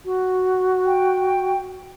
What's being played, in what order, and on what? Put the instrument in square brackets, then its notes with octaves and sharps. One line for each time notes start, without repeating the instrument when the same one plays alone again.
[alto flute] F#4
[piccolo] G5